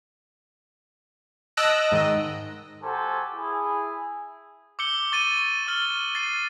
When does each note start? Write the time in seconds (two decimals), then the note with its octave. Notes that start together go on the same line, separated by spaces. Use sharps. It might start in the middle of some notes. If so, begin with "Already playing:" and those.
1.57 D#5 A5 E6 F#6 A#6 D7
1.92 G#2 D#3 D#5
2.83 F#4 G4 A4 A#4 C5 G#5
3.34 E4 G#4
4.79 D6 E6 G6 C#7 G7
5.12 C#6 A6 D#7
5.67 C#6 E6 F6 A6 G7
6.15 A6 C7 D#7